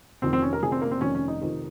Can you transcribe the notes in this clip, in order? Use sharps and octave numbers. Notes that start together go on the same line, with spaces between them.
F1 F2 D#3 C4
C4
C#4
A#4
F1 F2 D#3 G#4
C4
A#3
C4
F1 F2 D#3 C#4
C#4
D#4
F1 F2 D#3